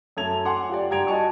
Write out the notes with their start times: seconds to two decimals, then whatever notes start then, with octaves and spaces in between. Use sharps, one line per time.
0.17 F#2 A3 A5 G#6 F7
0.45 F#5 G#5 C6 D6
0.69 F4 G4 D5
0.90 G2 G4 A#5 G#6 D7 F7
1.07 F#4 D#5 G#5 A5 C#6